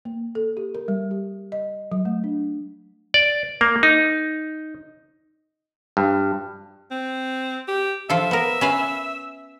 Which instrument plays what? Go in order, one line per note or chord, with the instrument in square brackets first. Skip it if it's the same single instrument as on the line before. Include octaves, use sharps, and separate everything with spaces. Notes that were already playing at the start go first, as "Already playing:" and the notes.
[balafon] A#3
A4
G4
A#4
G3
G4
D#5
F#3
A3
D4
[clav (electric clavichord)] D5
A#3
D#4
G2
[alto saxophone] C4
G4
[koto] F3 F4 A4 [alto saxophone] E5
[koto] B3 A#4
C#4 B4 F5